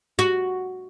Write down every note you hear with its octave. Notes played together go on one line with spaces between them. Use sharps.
F#4